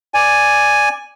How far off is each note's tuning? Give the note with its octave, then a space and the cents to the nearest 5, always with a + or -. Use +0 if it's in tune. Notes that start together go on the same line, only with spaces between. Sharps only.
D5 +0 G#5 +0